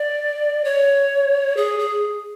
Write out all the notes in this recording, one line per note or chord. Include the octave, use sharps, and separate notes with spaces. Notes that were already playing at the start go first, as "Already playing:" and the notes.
Already playing: D5
C#5
G#4
G#4